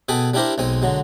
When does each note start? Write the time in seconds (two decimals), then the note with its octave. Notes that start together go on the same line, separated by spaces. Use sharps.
0.09 B2 G#4 A4 G5 G#5 B5
0.34 G3 D4 E4 G4 A#4 C5
0.58 B1 G#3 C4 G#5
0.82 D3 F#3 G#3